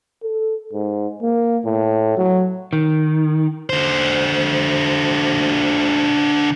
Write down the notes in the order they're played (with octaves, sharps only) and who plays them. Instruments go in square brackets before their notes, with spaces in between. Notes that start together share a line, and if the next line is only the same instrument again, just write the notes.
[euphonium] A4
G#2
A#3
A2
F#3
[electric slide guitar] D#3
[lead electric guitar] D3 C5